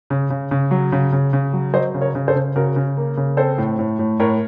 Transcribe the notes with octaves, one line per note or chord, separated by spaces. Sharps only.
C#3
C#3
C#3
F#3
C#3
C#3
C#3
F#3
F#3 C5 D#5
C#3
A#4 C#5
C#3
A4 C5
C#3
C#3 F#4 A#4
C#3
A#3
C#3
C4 A4 C5
A2
A2
A2
A2 A#4 C#5